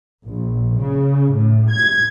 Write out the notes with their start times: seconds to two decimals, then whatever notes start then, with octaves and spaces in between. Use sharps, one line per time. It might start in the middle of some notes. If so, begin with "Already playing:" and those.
0.25 A#1
0.77 C#3
1.32 A2
1.71 G#6